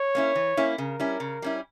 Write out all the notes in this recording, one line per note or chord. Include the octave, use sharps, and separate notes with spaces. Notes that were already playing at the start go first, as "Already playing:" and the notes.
Already playing: C#5
A#3 C#4 E4
E3
A#3 C#4 E4
C#3 A#4
G3 C#4 E4
C#3
G3 C#4 E4